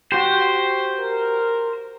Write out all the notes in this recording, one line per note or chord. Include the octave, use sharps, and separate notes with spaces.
F#4 G4 C5
A#4